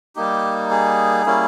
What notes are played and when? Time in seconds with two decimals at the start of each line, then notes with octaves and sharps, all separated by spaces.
0.16 G3 A#3 D#4 G4
0.71 G#4
1.26 G3 A#3 C#4 E4